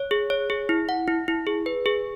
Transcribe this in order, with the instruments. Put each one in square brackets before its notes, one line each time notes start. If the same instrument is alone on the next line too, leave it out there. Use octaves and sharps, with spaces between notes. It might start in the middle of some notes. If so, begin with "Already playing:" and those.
Already playing: [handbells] C#5
G#4
C#5
G#4
E4
F#5
E4
E4
G#4
B4
G#4